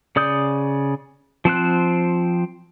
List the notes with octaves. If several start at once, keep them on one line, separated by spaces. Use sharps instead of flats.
C#3 D5 D#6 G6
F3 C4 C5 F#6